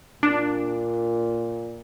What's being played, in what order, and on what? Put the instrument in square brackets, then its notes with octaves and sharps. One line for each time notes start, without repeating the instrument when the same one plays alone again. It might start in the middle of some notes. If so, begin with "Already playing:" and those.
[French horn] A#2 [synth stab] D4